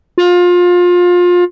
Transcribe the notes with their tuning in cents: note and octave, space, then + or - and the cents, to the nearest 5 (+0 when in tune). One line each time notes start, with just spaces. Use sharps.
F4 +25